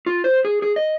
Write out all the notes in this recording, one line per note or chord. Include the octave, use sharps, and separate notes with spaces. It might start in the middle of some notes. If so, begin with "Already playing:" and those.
F4
C5
G#4
G#4
D#5